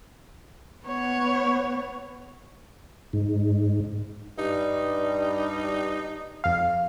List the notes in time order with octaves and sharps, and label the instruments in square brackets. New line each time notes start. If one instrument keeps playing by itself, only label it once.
[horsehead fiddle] B3 [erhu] C#5
[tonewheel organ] G#2
[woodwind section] G2 G3 [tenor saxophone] D#4
[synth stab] F2 F5